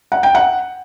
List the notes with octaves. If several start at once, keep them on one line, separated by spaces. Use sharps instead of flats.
F#5
G5
F#5